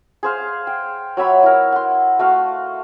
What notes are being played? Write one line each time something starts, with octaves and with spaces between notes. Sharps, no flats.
G#4 C5 F5
G5
F#3 C#5 E5 B5
E4 A#4
F#5 C6
A3 F#4 F5